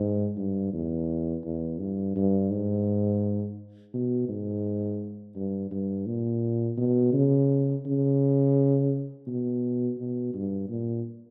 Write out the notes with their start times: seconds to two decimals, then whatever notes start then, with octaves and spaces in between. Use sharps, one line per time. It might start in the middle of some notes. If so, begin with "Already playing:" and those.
Already playing: G#2
0.37 G2
0.73 E2
1.44 E2
1.79 G2
2.16 G2
2.51 G#2
3.94 B2
4.29 G#2
5.36 G2
5.71 G2
6.07 A#2
6.78 B2
7.13 C#3
7.86 C#3
9.27 B2
9.98 B2
10.34 G2
10.69 A#2